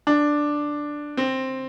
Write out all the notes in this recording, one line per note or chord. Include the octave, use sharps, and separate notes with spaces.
D4
C4